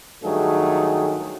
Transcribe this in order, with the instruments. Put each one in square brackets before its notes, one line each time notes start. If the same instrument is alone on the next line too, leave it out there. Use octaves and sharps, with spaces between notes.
[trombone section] G2 D#3 F#3 A3 G#4